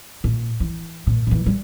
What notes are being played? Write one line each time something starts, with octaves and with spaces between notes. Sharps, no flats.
A#2
E3
A#2
A#2 E3
G3